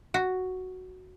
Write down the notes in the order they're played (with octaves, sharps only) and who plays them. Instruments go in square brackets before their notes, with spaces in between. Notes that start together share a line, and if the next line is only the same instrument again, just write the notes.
[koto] F#4